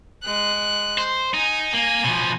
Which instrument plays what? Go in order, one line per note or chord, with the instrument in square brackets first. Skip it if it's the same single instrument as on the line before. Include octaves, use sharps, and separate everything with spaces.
[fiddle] G#3 F#6
[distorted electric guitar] C5
[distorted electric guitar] D#4 [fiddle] G#5
[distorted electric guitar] A#3 [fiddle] G#5
[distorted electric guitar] B2 F3